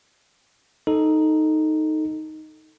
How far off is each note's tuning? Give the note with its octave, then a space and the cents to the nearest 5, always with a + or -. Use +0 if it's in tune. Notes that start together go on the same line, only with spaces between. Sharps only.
D#4 +0 A4 +0